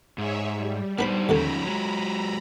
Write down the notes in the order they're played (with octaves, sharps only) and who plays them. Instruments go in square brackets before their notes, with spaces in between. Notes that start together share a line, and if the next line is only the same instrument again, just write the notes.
[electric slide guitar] G#2 [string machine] G#4 C#5 E5
[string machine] G3
[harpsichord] B3 B4 B5 [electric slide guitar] D4 D#4 C5
[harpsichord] D#2 D3 A4 [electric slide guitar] F3 C#4 D#4 [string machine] A#5 B5
[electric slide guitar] F#3 G#3